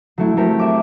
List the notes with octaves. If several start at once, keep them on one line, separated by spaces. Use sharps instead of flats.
F#3 A3 E4
F#3 A3 C4 G4 A#4
E5 D6